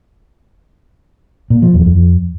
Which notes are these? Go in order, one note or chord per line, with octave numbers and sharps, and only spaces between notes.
A#2
F3
E2
F2